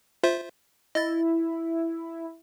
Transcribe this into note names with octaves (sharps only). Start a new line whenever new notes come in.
F4 C5 E5
E4 D#5 A6